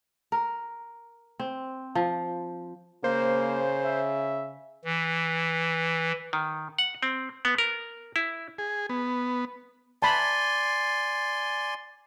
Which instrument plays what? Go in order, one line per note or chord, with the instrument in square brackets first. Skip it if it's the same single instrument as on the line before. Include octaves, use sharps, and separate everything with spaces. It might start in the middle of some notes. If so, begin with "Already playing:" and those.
[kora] A#4
C4
F3
[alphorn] C#3 [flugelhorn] A#3 [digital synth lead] C5
[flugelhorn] E5
[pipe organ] E3
[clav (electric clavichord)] D#3
F#5
C4
B3
A#4
E4
[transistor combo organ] G#4
B3
[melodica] D5 G#5 C6 [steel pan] A5 B5